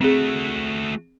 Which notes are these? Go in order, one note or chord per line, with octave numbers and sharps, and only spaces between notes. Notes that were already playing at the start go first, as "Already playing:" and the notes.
A3 C4 F#4 G#4